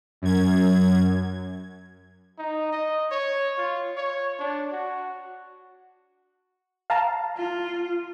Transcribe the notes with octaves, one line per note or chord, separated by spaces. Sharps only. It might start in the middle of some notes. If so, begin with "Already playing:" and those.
F#2 G#6
D#4
D#5
C#5
F4
C#5
D4
F#4
F5 A5 A#5
F4